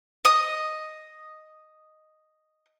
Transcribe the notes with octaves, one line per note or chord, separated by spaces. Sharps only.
D#5 D#6